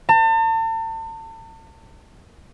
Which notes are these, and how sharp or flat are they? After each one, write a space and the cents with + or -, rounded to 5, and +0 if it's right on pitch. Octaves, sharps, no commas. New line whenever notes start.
A5 +40